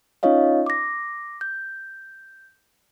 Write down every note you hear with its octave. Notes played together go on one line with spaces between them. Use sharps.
C#4 D#4 F4 C#5 D#5 F5
D6 A#6
G6